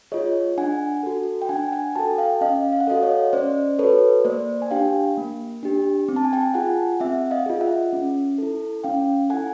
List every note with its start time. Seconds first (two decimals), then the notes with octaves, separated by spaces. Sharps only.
0.12 F4 G#4 C#5 D#5
0.58 D4 F#5 G#5
1.03 F#4 A4
1.42 G5
1.49 D4 F#5 G#5
1.72 F#5 G#5
1.96 F#4 G5 A5
1.99 A4
2.18 F5 G5
2.41 C#4 D#5 F5
2.73 F5
2.80 F#5
2.87 F#4 A4 D#5 F5
3.03 C#5 D#5
3.33 C#4 C5 D5
3.79 F#4 A4 B4 C#5
4.25 A#3 C5 D5
4.62 G#5
4.71 D4 G4 F5 G5
5.17 A#3
5.63 D4 G4
6.08 C4
6.16 A5
6.25 G#5
6.33 G5 A5
6.54 F4 G#4 F#5 G#5
7.00 C4 E5 F#5
7.31 D#5 F5
7.46 F4 G#4
7.61 E5 F#5
7.93 C#4
8.38 E4 A4
8.84 C#4 F5 G5
9.29 E4 A4 F#5 G#5